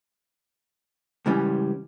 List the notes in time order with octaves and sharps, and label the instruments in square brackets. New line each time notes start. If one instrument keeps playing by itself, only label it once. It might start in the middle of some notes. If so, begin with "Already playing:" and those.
[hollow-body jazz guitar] C#2 G#2 E3 G3 C#4